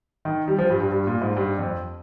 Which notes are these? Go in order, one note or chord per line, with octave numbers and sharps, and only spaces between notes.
D#3
G3
F3
G2
G2
G2
A#2
G#2
G2
F2